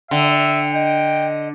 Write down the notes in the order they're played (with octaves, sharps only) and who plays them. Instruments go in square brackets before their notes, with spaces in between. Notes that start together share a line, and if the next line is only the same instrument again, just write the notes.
[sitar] D3 [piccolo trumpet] E5 [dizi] G5
[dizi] D#5 [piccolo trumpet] G5